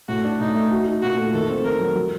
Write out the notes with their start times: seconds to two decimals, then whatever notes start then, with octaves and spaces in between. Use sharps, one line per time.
0.08 A2 F#4
0.25 D4
0.40 A2 D#4
0.55 A3
0.72 F#4
0.88 D#4
1.03 A#2 F#4
1.18 A3
1.34 D#3 A4
1.49 C4
1.65 D#3 A#4
1.80 F#3
1.95 F#3